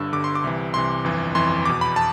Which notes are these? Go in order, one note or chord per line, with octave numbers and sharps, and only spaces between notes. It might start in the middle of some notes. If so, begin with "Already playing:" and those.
Already playing: G1 G2 D3 E6
G1 G2 D3 D6
C6
D6
C2 C3 E3
C2 C3 E3 C6
G1 F2 E3
G1 F2 E3 C6
E2 B2 D6
B5
A5